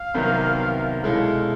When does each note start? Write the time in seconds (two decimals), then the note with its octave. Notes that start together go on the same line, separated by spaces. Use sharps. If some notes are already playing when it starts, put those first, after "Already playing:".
Already playing: F5
0.14 C2 C3 D#3 F#3 B3
1.03 B2 G#3 C#4 E4 A4 F5